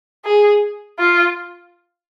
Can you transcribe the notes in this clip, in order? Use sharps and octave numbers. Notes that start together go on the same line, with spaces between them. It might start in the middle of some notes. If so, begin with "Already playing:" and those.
G#4
F4